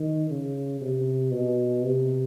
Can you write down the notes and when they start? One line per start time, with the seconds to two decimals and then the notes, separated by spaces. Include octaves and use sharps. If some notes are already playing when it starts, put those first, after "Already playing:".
Already playing: D#3
0.30 C#3
0.81 C3
1.31 B2
1.82 C3